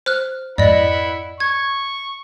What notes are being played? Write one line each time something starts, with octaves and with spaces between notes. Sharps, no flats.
C5 F6 F#6
F2 G#2 E4 D5 D#5 F#5 B5
C#6 G#6